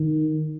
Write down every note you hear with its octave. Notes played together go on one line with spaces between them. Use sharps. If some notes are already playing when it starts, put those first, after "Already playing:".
Already playing: D#3